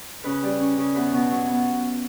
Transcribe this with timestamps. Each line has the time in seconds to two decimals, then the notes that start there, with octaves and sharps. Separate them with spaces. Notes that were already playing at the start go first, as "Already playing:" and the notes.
0.24 C#3 B4
0.43 G3
0.60 C#4
0.77 C#3
0.94 E2 B4
1.12 B2
1.30 F#3
1.48 B3